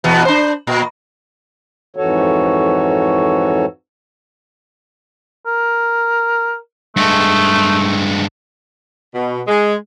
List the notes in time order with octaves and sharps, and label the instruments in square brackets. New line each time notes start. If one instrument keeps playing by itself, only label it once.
[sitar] E2 B2 B3
D4 C5
A#2
[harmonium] F2 G#2 E3 F#4 A4 C#5
[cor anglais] A#4
[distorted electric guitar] G2 G#3 [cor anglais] A3
[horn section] B2
G#3